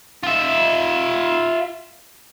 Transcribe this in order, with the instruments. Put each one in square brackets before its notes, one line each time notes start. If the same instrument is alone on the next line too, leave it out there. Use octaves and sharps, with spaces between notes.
[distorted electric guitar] F4 E5